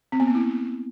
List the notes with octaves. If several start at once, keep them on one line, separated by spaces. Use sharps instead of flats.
C4
B3
A#3
E4